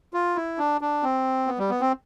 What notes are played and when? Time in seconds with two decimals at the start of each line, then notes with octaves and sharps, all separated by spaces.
0.14 F4
0.36 E4
0.58 D4
0.81 D4
1.03 C4
1.47 B3
1.59 G3
1.70 B3
1.81 C4